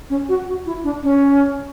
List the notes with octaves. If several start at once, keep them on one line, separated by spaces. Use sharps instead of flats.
C#4
F#4
F#4
E4
D4
C#4